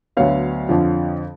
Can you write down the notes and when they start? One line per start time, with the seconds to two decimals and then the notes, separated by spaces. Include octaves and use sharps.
0.17 D2 D3 F#3 B3 C#5 F5
0.69 F2 D3 F3